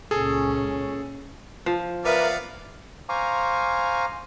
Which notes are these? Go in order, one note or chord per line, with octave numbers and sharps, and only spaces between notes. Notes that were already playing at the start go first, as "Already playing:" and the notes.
C#2 A#2 C#4 G#4 A4
F3
B3 A#4 B4 D5 E5 F5
C5 F5 G#5 A#5 C#6 D6